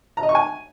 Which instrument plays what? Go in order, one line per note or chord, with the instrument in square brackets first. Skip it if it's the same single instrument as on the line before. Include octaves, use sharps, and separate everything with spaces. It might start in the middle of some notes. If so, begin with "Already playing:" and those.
[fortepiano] A#5
D#5
C#6
G#5